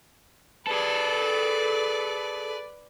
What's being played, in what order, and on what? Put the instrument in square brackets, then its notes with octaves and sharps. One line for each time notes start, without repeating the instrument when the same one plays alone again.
[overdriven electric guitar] G#4 A4 [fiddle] B4 D5